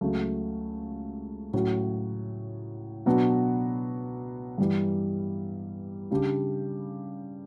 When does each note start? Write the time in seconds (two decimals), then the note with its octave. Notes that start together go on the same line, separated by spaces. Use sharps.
0.01 C#2 C#3 F#3 A3
1.53 A2 F#3 C#4 F#4
3.06 B2 F#3 B3 D4 F#4
4.58 G2 E3 G3
6.11 C#3 G3 D4 G4